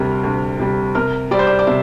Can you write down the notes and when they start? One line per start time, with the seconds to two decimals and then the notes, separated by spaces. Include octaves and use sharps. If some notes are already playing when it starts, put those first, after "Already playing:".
Already playing: D2 C3 G3 A#4
0.24 D2
0.60 C3 G3
0.95 C3 A#4
1.31 G3 C4 D5
1.39 C5
1.47 D5
1.59 D5
1.67 C3 E5